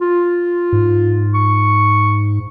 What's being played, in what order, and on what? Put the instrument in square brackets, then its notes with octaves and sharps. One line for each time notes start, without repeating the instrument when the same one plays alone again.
[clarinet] F4
[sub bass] G#2
[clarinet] C#6